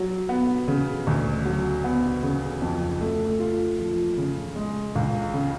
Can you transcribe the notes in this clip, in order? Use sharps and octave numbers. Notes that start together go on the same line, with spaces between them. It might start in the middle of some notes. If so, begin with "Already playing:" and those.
Already playing: F#3
B3
C#3
D2
F#3
B3
C#3
F2
A3
F4
F3
C#3
G#3
C#2
C#3